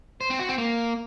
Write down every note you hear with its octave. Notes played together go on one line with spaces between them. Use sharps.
C5
C4
F#4
C4
A#3